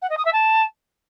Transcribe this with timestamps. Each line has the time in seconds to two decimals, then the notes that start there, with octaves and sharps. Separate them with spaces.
0.01 F#5
0.09 D#5
0.17 D#6
0.25 E5
0.32 A5